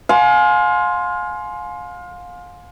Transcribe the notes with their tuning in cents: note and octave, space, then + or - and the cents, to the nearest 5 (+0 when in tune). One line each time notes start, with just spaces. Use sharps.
F5 +30 G#5 +25 C6 +0